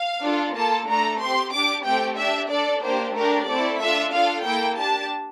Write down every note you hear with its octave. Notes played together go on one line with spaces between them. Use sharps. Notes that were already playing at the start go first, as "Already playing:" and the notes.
Already playing: F5
D4 F4 A4
A#3 F4 A4 A5
A3 D4 A4 A#5
C4 G4 C6
D4 G4 D6
A3 C4 G4 G5
D4 G4 E5
D4 A4 D5
A#3 D4 G4 C5
A3 D4 G4 A#4
A3 C4 E4 A4 D5
D4 F4 A4 E5
D4 F4 A4 F5
A#3 E4 A4 G5
D4 G4 A5